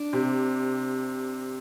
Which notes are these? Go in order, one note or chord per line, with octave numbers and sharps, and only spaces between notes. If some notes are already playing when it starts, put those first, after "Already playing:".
Already playing: D4
C3